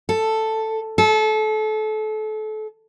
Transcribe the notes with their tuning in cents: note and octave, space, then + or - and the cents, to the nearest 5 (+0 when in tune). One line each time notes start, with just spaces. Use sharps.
A4 +5
A4 -30